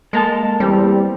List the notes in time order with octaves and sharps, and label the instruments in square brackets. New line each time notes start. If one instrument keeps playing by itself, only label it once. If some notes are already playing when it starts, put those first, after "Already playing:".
[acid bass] G#3 [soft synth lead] A#3 [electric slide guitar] A4 A#4 A5
[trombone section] E2 C4 G4 [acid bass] G3